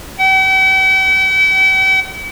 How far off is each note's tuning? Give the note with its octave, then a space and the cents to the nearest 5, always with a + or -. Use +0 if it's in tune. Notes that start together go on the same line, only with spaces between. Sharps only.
G5 -45